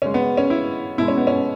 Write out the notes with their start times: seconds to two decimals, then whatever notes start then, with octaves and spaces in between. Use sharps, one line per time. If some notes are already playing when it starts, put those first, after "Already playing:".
0.02 C#3 G#3 C#4
0.14 B3
0.37 C#4
0.50 E4
0.98 B2 G#3 E4
1.08 C#4
1.18 B3
1.27 C#4